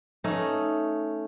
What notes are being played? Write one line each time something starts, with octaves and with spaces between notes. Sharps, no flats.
A3 C#4 D#4